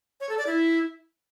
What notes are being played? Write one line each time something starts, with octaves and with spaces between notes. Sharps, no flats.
C#5
A4
D5
E4